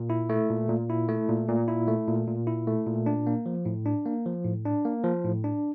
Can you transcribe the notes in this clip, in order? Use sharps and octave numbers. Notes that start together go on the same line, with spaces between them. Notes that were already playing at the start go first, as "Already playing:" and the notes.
Already playing: A#2
E4
A3
A#2
A#2
E4
A3
A#2
A#2
E4
A3
A#2
A#2
E4
A3
A#2
D4
A#3
F3
A2
D4
A#3
F3
A2
D4
A#3
F3
A2
D4